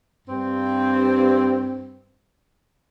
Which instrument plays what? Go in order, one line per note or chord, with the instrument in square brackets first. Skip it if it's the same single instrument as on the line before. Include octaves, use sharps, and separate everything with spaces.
[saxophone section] G2 C4